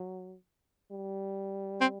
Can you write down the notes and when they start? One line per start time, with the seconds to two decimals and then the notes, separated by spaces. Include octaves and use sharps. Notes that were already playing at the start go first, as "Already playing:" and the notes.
Already playing: F#3
0.91 G3
1.81 C4